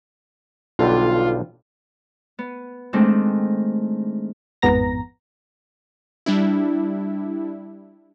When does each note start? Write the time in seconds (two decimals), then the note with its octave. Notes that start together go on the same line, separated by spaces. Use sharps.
0.79 B1 D3 G3 F4
2.39 B3
2.93 D#3 G#3 A3 C4 D4
4.62 A1 F2 G#2 B3 A#5 A#6
6.26 G3 D4 E4